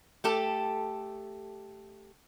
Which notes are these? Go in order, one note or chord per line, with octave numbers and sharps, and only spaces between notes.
A3 G4 A4